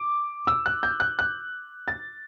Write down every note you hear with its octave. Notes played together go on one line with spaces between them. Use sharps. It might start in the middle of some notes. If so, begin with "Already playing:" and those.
Already playing: D6
E6
F#6
G6
F#6
F#6
A6